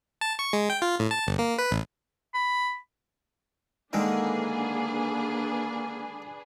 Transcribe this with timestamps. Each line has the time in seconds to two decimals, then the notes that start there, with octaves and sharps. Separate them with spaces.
0.21 A5
0.39 C#6
0.53 G#3
0.70 G5
0.82 F4
0.99 A2
1.11 A5
1.27 G1
1.39 A#3
1.59 B4
1.71 A1
2.34 B5
3.93 D3 D#3 G#3 A#3 D4 G#4 B4